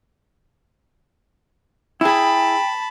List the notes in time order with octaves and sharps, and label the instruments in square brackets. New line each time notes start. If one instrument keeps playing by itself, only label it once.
[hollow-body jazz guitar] E4 G#4 [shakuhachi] G5 [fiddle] A5 B5